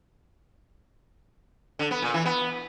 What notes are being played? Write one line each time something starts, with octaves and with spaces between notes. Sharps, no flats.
D3
B3
A#2
E3
B3